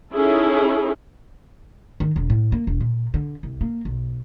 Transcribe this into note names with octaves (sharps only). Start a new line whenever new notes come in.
C#4 D#4 E4 G#4 A4
D#3
E1
A2
A#3
E1
A#2
D3
C2
A#3
B1